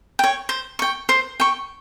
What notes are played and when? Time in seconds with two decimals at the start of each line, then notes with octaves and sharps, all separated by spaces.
0.19 C#5 G5
0.49 C5
0.79 G5 C#6
1.09 C5
1.40 G5 C#6